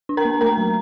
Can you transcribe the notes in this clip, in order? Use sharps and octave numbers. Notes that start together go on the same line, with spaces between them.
D4
A#4 A#5
A#3
A3 A#4 A#5
F#3